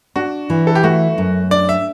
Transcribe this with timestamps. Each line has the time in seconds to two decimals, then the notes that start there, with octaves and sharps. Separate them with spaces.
0.16 D4 F#4
0.50 E3
0.67 A4
0.75 G4
0.83 A3 F#4
1.18 F#2
1.51 D4 D5
1.69 E5